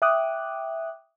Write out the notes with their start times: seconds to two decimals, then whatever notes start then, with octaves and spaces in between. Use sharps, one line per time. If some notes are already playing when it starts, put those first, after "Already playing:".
0.02 E5 G5 D6 D#6 F#6